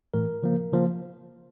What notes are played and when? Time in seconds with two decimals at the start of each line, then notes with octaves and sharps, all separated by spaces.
0.14 A2 E3 A3 A#4
0.43 C#3 F3 A#3
0.72 C#3 F3 A#3